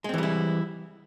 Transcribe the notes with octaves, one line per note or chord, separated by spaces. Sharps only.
E3 G3 G#3 C4 E4